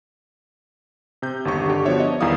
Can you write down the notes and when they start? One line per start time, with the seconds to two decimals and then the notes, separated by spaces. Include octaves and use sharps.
1.22 C3 G6
1.45 G1 D#2 G4 C#6
1.68 D3 G4
1.85 F3 B3 D4 F#4 C#5 E5
2.00 D#5
2.21 E2 D#3 G3 E4 F5 D#6